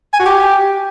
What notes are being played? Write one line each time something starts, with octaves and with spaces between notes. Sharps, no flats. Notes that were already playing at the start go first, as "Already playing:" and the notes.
G#5
F#4
G4